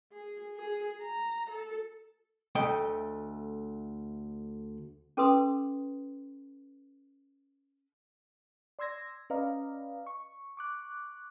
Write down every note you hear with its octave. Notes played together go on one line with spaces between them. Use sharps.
G#4
G#4
A#5
A4
D2 A3 D#5 G5
C#4 A4 B4 C6 D#6
D5 C6 E6 G#6 A#6
C#4 B4 D5 D#5 F5 A#5
C#6
C#6 D6 F#6